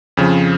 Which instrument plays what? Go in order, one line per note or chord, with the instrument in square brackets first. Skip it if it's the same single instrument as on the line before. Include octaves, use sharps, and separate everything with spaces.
[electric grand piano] F2 C#3 F3